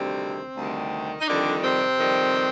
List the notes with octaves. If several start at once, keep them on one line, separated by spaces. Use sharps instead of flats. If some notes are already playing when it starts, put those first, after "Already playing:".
Already playing: D2 C3 D#3 G3 C4
D2 C3 D#3 G3
D#4
F2 D3 D#3 G3 D4
C3 C4
F2 D#3 G3